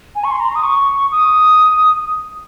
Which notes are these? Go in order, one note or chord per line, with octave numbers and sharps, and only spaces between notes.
G#5
C#6
C6
A#5
D#6
C#6
D#6